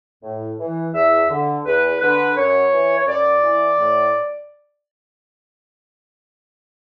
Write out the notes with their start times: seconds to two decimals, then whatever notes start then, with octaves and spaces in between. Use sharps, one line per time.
0.23 A2
0.59 E3
0.94 E2 E5
1.29 D3
1.65 E2 B4
2.00 D3 B4
2.37 F#2 C#5
2.72 E3
2.98 C#5
3.07 F#2 D5
3.43 E3
3.78 A2